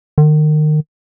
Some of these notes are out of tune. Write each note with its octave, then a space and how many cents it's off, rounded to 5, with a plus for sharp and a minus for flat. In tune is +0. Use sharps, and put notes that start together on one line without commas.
D#3 -30